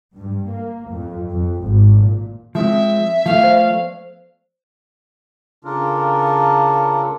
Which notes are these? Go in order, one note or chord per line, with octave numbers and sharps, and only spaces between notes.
G2
A#3
F2
F2
G#1
A#2
F3 G#3 C4 E5
F3 A3 B3 F5
C5 D5
C#3 D4 F4 A4 A#4